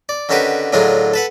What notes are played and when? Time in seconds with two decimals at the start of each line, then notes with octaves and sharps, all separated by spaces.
0.09 D5
0.29 D3 D#3 C#4 F#4 G4 B4
0.73 A2 D3 D#3 F#3 F4 G#4
1.14 A4 B4 F#5